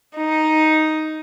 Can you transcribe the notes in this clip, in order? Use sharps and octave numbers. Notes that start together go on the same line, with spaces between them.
D#4